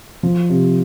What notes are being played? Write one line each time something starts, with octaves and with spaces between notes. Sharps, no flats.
F3
C3